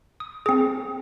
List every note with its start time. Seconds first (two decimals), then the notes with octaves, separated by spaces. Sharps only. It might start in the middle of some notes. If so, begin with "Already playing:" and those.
0.20 D#6
0.46 C4 G#4